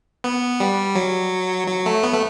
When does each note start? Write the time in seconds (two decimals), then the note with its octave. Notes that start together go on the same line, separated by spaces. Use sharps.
0.24 B3
0.60 G3
0.95 F#3
1.67 F#3
1.86 A3
2.03 B3
2.13 A3